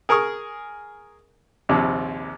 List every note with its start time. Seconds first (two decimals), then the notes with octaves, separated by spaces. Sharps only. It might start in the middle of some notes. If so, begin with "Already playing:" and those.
0.09 G#4 A#4 G#5 C#6 D#6
1.69 A#1 D#2 C3